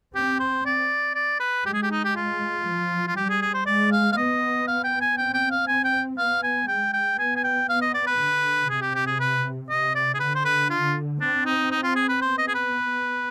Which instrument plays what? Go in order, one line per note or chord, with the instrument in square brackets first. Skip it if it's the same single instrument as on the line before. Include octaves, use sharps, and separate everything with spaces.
[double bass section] C4 [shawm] G4
[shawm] C5
D5
D5
B4
[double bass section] G#3 [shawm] G4
[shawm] G#4
G4
D#4
G4
F4
[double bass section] F3
[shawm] F4
[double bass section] G3 [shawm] G4
[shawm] G#4
G#4
C5
[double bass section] G#3 [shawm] D5
[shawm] F5
F5
[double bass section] B3 [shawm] D#5
[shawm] F5
G5
G#5
[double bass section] C4 [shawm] G5
[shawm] G5
F5
[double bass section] C4 [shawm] G#5
[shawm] G5
[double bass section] B3 [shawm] F5
[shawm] G#5
[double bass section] G#3 [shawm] G5
[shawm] G5
[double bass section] B3 [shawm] G#5
[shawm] G#5
G5
[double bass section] B3 [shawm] F5
[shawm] D#5
D5
B4
[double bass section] D3
[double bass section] C3 [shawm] G#4
[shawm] G4
G4
G#4
B4
[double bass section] C3 [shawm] D#5
[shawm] D5
G#4
[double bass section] D3 [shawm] B4
[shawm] C5
B4
F4
[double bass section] C4 [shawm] D4
[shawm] D#4
D#4
F4
G#4
B4
[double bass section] B3 [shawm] C5
[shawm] D#5
G#4
B4